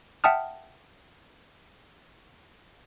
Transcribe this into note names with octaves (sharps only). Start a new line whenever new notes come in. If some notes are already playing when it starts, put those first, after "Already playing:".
E5 F#5 G5 A5 D#6 F6